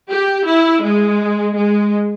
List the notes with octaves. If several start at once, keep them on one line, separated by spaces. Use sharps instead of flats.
G4
E4
G#3
G#3